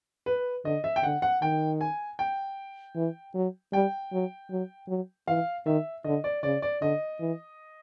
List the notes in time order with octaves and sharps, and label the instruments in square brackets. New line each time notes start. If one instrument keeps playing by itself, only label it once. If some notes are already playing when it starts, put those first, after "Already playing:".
[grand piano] B4
[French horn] D3 [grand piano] D#5
[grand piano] E5
G5
[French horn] D3 [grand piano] F#5
[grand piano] F#5
[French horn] D#3 [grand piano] G5
[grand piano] G#5
G5
[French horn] E3
F#3
[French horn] G3 [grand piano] G5
[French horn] F#3
F#3
F#3
[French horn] E3 [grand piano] F5
[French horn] D#3 [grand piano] E5
[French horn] D3 [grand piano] D#5
[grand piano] D5
[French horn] C#3 [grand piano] D5
[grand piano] D5
[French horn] D3 [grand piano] D#5
[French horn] E3